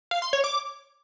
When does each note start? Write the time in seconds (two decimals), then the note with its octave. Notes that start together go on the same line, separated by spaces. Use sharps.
0.11 F5
0.22 C6
0.33 C#5
0.44 D6